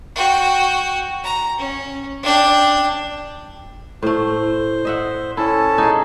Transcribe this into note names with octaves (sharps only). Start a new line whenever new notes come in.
F#4 G5
A#5
C#4
D4 G5
A2 A3 C5
D#5 E5 F#5
C#4 E4 A4 A5
D#4 G#4